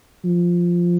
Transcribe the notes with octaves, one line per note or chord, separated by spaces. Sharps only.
F3